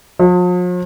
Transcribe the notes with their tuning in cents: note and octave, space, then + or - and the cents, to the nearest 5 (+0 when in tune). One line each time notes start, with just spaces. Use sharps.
F3 +45